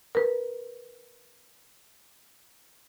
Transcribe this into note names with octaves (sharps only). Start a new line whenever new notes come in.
A#4 B4